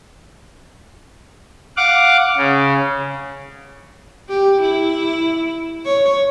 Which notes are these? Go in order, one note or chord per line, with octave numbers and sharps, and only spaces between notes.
F5 F#5 D6
C#3
G4
E4
C#5